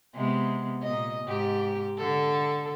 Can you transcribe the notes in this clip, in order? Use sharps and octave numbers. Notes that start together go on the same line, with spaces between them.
C3 G#3 B3
A#2 D#5
G#2 G4
D3 A4